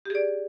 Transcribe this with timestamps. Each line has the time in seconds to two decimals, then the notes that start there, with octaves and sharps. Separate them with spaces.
0.06 G4
0.10 G#4
0.15 D5